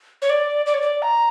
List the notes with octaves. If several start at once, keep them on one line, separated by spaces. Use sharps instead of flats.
C#5
D5
D5
C#5
D5
A#5